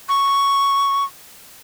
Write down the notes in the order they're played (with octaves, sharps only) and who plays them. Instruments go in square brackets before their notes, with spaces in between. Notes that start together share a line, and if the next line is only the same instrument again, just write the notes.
[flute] C#6